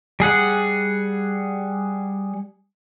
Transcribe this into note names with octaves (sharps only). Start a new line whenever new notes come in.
G3 G#4 F#5